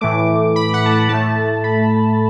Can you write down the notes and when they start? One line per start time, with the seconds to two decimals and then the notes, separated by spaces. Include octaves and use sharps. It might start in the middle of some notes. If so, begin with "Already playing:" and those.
0.01 A2 E3 A3 D6
0.56 B5
0.74 F#5
0.85 A5
0.92 F#5
1.09 A2 A3 A5
1.64 B5